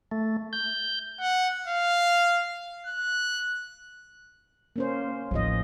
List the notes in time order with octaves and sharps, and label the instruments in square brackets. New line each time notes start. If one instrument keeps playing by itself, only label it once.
[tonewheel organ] A3
G6
[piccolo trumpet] F#5
F5
F#6
[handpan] A#3 C#4 C5
[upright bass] A1 D#2 [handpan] F3 D#5